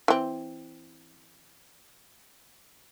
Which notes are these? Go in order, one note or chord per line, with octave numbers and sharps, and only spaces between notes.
E3 C4